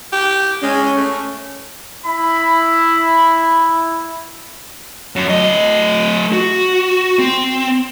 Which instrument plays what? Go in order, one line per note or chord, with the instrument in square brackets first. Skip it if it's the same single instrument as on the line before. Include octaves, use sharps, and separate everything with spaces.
[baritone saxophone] G4
[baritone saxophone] G#3 [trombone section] C#4
[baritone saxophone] A3
[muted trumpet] E4 [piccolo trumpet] B5
[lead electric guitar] F#2
A3 D#5
F#4
C4